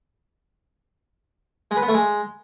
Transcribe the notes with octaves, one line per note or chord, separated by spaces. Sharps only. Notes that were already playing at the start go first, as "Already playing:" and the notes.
G#3
B4
B3
A3
G#3